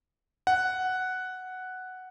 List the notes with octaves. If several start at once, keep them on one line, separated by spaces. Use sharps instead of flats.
F#5